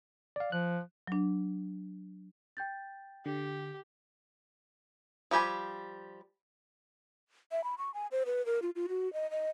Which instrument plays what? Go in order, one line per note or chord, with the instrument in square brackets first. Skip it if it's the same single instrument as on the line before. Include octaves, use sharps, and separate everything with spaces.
[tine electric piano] D5 F5
[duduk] F3 [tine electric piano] F#6
[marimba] F#3 D4
[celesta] G5 G6 A6
[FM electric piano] D3 [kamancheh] G4
[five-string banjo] F3 G3 G4 G#5 B5
[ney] E5
B5
C#6
G#5
C5
B4
A#4
F4
F4
F#4
D#5
D#5